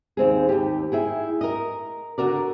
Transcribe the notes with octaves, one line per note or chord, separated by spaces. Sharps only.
D#2 C4 G#4
D#2 G4
E4 G#4 G5
A#4 D#5
D3 F#4 A#4 D5